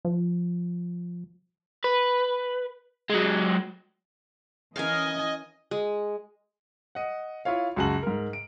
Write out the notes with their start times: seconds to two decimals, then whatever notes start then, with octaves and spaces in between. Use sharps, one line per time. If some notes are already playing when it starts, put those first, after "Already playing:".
0.05 F3
1.84 B4
3.10 F#3 G#3
4.76 E3 C#4 A#4 D#5 F5 G#5
5.71 G#3
6.95 D#5 F#5
7.45 E4 F4 C#5 F5
7.76 C#2 F#2 F#4 G#5 A5 F#7
8.03 G#2 A#4
8.33 D7